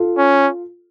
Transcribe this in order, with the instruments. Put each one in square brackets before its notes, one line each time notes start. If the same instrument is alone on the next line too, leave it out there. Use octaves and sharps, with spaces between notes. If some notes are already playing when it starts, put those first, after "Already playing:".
Already playing: [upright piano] F4 A4
[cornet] C#4